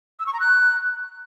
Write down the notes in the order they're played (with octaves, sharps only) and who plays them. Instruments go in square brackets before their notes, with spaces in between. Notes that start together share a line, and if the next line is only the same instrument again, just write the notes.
[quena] E6
C#6
A#5
F#6